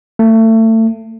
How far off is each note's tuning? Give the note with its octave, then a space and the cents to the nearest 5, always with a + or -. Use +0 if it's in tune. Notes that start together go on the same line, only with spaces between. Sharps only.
A3 +30